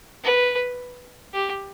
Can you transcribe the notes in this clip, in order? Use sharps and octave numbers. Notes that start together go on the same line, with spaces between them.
B4
G4